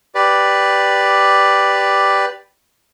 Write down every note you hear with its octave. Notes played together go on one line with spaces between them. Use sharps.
G4 B4 D5